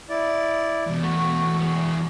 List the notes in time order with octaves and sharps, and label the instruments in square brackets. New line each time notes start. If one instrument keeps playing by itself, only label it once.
[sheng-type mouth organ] E4 D5
[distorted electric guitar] E2 B2
[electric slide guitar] A3 [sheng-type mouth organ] F#4
[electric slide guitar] B3 G#4